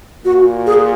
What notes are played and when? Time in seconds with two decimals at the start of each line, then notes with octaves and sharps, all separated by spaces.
0.25 A#2 F#4
0.66 G#4